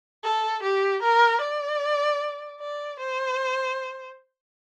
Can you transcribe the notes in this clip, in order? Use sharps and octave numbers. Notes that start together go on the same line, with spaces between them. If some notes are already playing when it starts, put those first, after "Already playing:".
A4
G4
A#4
D5
D5
C5